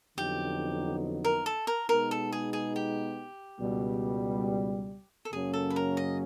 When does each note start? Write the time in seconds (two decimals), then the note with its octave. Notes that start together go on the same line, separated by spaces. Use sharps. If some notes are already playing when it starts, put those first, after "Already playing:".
0.18 F2 D3 F#3 B3 D#4 G4
1.25 A#4
1.46 A4
1.67 A#4
1.89 B2 G#3 B3 D#4 A#4
2.11 A4
2.32 G#4
2.53 G#4
2.76 G4
3.60 C#2 B2 G3
5.25 A4
5.32 F#2 C#3 F#3 A#3 C#4 G#4
5.53 A4
5.70 B4
5.76 A#4
5.97 D#5